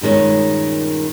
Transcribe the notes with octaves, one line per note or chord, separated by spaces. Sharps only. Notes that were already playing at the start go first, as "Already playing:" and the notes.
G2 A#2 D#3 G#3 C#4